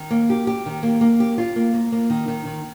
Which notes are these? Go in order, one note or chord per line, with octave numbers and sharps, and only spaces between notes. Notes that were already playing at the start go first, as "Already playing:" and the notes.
Already playing: D#3
A#3
G4
G4
D#3
A#3
A#3
G4
F4
A#3
A#3
A#3
D#3
D#3
D#3